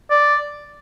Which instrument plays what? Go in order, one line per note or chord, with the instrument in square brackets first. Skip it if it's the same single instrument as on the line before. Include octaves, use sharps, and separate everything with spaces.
[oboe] D5